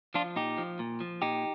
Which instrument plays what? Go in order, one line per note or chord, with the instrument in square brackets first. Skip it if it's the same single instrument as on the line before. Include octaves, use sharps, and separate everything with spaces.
[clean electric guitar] F3 D4 F4
A#2 D#4 G4
F3
A#2
F3
A#2 D#4 G4